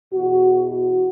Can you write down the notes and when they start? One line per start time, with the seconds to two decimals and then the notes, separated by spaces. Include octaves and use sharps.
0.13 E2 B2 F#4
0.67 F#4